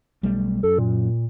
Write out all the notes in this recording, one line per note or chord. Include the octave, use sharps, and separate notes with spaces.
B1 G3 A3
F#2 A4
A#2